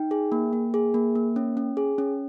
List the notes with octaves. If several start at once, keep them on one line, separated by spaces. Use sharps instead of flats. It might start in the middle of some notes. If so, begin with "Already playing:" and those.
Already playing: D#4 G5
G#4
A#3
A#3
G#4
A#3
A#3
C#4
C#4
G#4
C#4